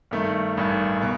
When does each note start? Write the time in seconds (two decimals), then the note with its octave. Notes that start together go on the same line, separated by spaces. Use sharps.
0.11 G2 D#3 A3
0.57 A1 G2 D#3
1.02 B2